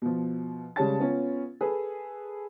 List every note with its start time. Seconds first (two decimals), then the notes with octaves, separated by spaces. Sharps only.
0.02 B2 F3
0.76 C#3 G3 G#3 C#5 A5 A6
1.00 B3 C#4 F4
1.61 G#4 A4 B4